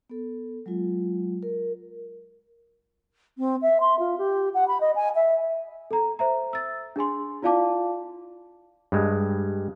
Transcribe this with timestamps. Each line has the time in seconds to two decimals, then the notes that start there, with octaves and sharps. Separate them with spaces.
0.10 B3 A4
0.66 F#3 G#3 F4
1.43 A#4
3.38 C4
3.62 E5
3.80 C6
3.99 F4
4.18 G4
4.54 F#5
4.68 B5
4.81 D#5
4.96 G#5
5.15 E5
5.91 A4 A#5
6.19 C5 E5 A#5
6.53 E6 A6
6.96 D4 G#4 G#5 C6
7.42 E4 F4 D5 F5 A5 D6
8.92 G2 G#3